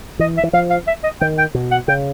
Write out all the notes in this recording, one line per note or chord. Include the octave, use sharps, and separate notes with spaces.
E3 D#5
E5
E3
F3 F5
F5
E5
D#5
D#3 G5
G5
B2
F#5
C#3 G5